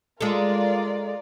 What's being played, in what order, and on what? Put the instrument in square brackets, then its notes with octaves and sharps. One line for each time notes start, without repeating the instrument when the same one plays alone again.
[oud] G#3 A4 [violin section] F4 A#4 D5